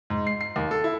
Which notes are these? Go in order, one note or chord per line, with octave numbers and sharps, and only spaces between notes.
G#2
C7
C7
D#2
A4
E4